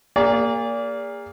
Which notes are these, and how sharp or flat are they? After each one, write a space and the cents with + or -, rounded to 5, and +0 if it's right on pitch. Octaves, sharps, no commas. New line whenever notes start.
A#3 +0 G#4 -35 D5 -30